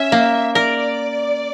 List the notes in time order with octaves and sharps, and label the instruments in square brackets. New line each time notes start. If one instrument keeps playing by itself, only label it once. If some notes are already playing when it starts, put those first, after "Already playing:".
Already playing: [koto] C#4 [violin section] E5
[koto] A#3
[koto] A#4 [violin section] D5